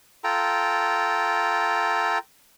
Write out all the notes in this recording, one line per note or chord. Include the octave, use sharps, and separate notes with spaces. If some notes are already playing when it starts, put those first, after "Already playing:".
F4 A4 G5 A#5